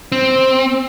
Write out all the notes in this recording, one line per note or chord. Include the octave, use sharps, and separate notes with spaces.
C4